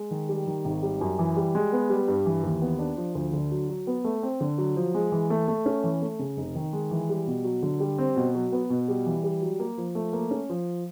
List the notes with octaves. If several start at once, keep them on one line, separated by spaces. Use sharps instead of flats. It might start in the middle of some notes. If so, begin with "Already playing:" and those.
Already playing: G#3
D#3
G3
D#3
G#1
G3
F#2
E3
G3
G#3
B3
G3
G2
E3
D#2
B3
D4
F3
D2
D3
F#3
F#3
B3
A3
C4
D3
F#3
F3
G#3
E3
A3
A3
C#4
E3
A3
C#3
F1
D#3
G#3
E3
G3
B2
F#3
D3
G3
C4
B2
F#3
B3
B2
G3
E3
G3
F#3
A#3
F3
A3
A#3
C#4
F3